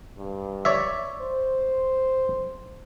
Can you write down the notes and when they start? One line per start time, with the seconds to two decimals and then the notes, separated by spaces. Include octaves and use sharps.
0.18 G2
0.65 C#5 D5 E5
1.21 C5